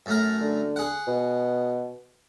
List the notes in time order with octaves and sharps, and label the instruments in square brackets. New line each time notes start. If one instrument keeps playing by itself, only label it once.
[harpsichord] F#2 A3 A#4
[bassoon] D3
[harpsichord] G#4 F#5
[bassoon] B2